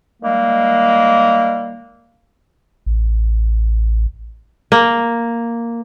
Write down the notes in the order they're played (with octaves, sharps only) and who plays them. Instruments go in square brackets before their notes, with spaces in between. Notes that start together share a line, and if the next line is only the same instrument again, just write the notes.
[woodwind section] D#3 G3 G#3 A#3
[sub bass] A1
[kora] A#3